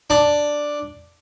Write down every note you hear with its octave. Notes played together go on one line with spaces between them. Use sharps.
D4